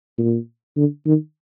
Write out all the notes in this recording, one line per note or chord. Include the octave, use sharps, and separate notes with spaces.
A#2
D3
D#3